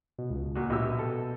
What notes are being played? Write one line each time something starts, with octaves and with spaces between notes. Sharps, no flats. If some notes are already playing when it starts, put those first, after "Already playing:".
B2
C#2
A#2 F#4
A#1 B2 G4 E6
A4